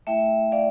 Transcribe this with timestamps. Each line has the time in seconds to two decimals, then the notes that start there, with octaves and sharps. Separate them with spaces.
0.07 A3 E4 E5 G5
0.52 D5 F5